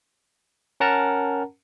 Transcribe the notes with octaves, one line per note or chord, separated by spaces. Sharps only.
C#4 A#4 F#5 A5 A#5